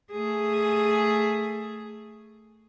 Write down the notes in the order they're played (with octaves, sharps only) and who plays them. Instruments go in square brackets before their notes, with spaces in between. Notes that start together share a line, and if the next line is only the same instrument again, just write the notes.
[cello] A3 G#4